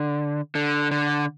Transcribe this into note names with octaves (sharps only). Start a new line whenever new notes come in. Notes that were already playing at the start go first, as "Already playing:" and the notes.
Already playing: D3
D3
D3